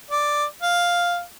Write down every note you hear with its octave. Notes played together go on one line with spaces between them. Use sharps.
D5
F5